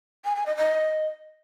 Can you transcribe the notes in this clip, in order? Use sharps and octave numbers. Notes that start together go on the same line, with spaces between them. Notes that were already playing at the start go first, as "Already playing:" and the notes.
G#5
G#5
D#5
D#5